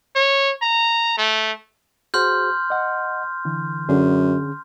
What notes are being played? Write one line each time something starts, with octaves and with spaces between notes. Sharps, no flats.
C#5
A#5
A3
F#4 G#4 C5 C6 F6 G6
D#5 F#5
D3 E3
F#2 D3 C#4 G#4